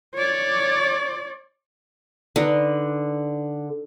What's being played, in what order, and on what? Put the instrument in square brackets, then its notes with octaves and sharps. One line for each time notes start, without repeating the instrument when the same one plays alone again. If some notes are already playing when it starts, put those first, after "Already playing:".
[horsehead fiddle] C#5 D5
[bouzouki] D3 [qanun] D#4 B4 D#5